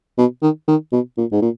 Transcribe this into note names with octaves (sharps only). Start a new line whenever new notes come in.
B2
D#3
D#3
B2
A#2
G#2
A#2